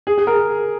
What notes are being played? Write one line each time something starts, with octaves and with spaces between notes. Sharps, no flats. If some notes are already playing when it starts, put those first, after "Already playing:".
G#4
G#4
A#4